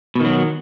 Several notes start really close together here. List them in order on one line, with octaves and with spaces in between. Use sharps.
B2 D#3 F#3